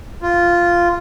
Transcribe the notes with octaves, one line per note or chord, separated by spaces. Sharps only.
F4